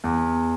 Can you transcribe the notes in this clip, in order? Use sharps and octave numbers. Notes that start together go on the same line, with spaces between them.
E2